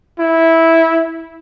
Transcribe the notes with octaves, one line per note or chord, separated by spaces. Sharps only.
E4